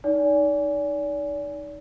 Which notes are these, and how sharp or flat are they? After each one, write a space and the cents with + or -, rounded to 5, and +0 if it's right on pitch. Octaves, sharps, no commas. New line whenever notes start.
D#4 +0 D5 -40 G#5 +0